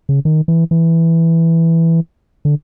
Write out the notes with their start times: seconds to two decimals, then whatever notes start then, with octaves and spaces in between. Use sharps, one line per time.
0.09 C#3
0.25 D#3
0.48 E3
0.71 E3
2.45 D3